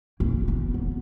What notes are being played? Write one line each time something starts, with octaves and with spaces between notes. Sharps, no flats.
A#3
B3
B3